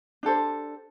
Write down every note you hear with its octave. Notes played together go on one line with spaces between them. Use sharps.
D4 G4 A4 C5